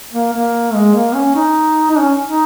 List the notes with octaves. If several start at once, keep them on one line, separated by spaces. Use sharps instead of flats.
A#3
A#3
G#3
A#3
C#4
D#4
D#4
C#4
D#4